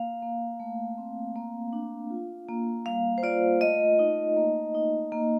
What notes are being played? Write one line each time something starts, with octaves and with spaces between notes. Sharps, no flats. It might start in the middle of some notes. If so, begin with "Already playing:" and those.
Already playing: A#3 F5
A#3
A3
C4
A#3
D4
F4
A#3
G3 F5
C5
F4 D5
A3 D#5
D#4
A#3
D#4
A#3